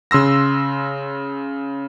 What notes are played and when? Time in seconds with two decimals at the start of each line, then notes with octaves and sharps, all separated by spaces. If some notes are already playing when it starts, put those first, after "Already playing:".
0.11 C#3 C6 E6 A#6